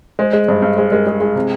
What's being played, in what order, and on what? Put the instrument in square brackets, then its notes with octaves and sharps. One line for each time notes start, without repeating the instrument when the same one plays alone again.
[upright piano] G#3 [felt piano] G#4 C5
[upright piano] G#3
[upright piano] G2 [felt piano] C5 D#5
[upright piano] G2
[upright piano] G#3 [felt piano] G#4 C5
[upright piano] G#3 [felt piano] G4 A#4
[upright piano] G#3 [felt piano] G#4
[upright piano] G#3 [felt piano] G#4
[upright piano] C3 [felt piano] G#4